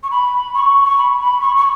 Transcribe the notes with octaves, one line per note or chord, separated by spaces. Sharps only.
C#6
B5
C#6
C#6
B5
B5
C#6
C#6